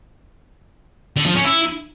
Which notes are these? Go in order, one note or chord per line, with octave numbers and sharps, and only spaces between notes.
D3
F3
C#4
E4